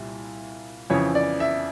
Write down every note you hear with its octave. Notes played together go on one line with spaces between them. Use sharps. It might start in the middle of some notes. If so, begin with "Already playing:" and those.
Already playing: C2 A#2 G3
F2 C#3 E3 C#5
D5
E5